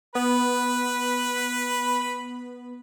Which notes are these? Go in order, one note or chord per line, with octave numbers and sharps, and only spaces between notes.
B3 B4 B5